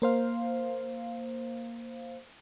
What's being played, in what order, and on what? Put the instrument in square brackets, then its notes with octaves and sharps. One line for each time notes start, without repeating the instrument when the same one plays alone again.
[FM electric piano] A#3 C5 F5